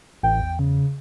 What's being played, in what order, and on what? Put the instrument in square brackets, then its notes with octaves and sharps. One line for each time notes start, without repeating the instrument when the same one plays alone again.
[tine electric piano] A1 [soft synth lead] G5
[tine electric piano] E2
[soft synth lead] C#3